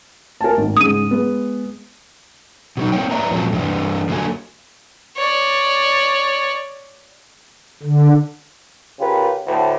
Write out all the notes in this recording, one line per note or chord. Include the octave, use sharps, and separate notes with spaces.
A#4 G#5 A5
G#1
G#2 C#3 G#3 D#6 D#7
G#3 B3
B2 F#3 D#4
A#3 C4 C#5 G5
B4 C#5 D5 E5 A#5
A#2 F3 F#3 G#3 C4 A4
G2 E3 D4
D3 F#3 A#3 A4 D5 G#5
C#5 D5
D3
C#3 F4 G4 A#4 B4
D2 A2